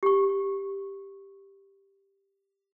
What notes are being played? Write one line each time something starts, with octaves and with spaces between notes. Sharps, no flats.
G4 C#6